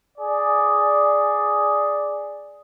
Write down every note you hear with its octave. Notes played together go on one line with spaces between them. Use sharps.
G#4 D5